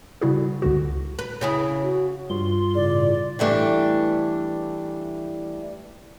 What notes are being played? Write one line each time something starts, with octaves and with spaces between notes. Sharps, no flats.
C#3 G3 E4 F#4 G#4
C#2 D3 F#4
B4
C#3 E4 G#4
F#4
G2 F4 C6
A2 C#3 D5
E3 G3 A3 D4